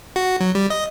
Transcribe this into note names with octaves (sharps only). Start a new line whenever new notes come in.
F#4
F#3
G3
D#5